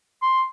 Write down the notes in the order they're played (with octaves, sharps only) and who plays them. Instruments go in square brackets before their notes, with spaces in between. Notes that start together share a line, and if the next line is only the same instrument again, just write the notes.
[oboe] C6